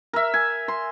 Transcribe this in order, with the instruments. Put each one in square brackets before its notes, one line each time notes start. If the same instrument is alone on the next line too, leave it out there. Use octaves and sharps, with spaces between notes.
[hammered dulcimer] A#4 E5
G#5
C6